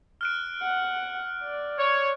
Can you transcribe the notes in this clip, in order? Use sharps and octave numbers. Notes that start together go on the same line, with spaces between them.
F6 F#6 D7
F#5
D5
C#5